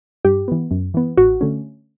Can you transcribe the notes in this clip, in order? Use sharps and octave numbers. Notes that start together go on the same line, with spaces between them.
G2 G4
E3 B3
F#2
E3 B3
A1 F#4
D3 A3 C#4